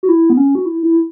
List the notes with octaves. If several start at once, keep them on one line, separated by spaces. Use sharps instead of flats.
F#4
E4
B3
C#4
F#4
E4
E4